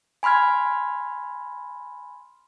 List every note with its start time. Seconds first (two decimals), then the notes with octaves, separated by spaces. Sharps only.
0.23 G#5 B5 C6 F6 G#6